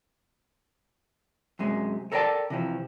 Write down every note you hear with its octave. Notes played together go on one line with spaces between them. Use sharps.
F#2 C3 G#3
A4 A#4 D5 D#5 G5 A5
C3 E3 F3